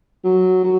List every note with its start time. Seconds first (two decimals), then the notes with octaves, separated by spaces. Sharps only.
0.24 F#3
0.64 F#3